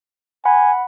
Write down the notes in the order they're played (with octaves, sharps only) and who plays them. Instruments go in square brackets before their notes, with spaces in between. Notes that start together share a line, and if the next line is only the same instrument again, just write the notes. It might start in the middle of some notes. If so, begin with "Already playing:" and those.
[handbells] F#5 B5 [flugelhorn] G#5